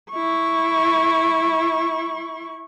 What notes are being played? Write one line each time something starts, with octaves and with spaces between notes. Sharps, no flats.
E4 C#6